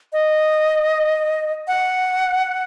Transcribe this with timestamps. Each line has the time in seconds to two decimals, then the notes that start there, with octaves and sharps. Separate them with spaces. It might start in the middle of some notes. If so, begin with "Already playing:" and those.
0.13 D#5
1.68 F#5